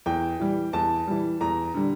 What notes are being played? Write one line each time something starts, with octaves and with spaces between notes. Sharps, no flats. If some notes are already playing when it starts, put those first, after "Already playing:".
E2 G5
E3 G3
E2 A5
E3 G3
E2 A#5
D3 G3